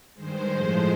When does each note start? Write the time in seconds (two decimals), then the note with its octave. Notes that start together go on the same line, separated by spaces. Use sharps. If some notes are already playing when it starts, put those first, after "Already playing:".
0.15 G2 D#3 G#3 C5
0.48 A2 F3 G#3